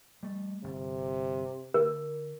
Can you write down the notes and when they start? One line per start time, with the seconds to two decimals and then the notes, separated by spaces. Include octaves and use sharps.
0.23 G3 A3
0.64 G1 C3
1.74 D3 A#4